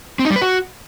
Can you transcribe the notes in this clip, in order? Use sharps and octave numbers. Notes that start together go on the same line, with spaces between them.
C4
D#4
G3
B4
F#4